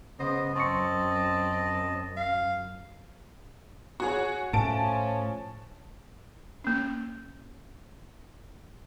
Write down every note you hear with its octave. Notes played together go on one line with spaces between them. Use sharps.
C#3 B3 C5 D#5
F#2 C4 D#5 A5 C6 C#6 C#7
F5
F#4 G#4 C#5
A2 F3 C#4 A5 D7
A#3 C#4